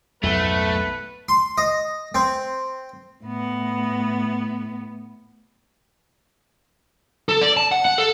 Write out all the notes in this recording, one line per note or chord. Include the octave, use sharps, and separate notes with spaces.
B1 F2 G#2 A3 B4
C6
D#5
C4
A2 B3
A4
D5
A5
F#5
F#5
A4